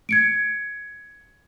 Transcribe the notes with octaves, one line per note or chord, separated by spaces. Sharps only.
G#6 C#7 D7